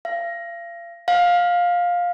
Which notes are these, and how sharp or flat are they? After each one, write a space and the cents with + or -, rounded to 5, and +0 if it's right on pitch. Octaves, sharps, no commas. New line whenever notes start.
F5 -35
F5 +15